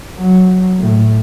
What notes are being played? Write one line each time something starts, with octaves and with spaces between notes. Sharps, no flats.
F#3
A2